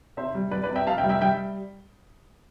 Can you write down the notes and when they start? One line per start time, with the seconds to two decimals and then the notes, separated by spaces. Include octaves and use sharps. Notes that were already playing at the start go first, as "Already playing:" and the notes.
0.17 C3 C5 E5
0.35 G3
0.51 G3 B4 D5
0.64 B4 D5
0.70 C3
0.76 E5 G5
0.87 F1 F5 A5
0.98 E5 G5
1.04 G3
1.09 E5 G5
1.21 G3 E5 G5